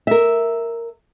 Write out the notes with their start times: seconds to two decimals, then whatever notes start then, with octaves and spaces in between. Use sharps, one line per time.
0.07 A#4 E5